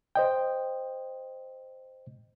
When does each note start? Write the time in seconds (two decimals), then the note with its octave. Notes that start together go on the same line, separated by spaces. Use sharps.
0.15 C5 D#5 G5